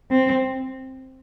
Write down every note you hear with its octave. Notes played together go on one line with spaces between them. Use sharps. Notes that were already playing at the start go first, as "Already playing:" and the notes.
C4